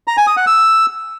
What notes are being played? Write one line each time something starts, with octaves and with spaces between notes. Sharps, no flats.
A#5
G#5
D#6
F#5
E6